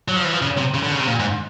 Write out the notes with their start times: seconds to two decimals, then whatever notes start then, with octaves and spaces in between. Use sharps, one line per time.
0.08 F#3
0.16 F3
0.25 E3
0.33 F3
0.42 C#3
0.58 C3
0.74 C#3
0.83 D3
0.92 C#3
1.00 C3
1.07 A#2
1.20 G#2